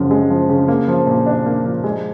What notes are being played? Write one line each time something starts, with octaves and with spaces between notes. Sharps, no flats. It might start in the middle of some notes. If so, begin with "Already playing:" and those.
Already playing: F#2 C#3 F3
G#3
F3
C#3
A#3
F3
A#2
D4
A#3
F3
G#3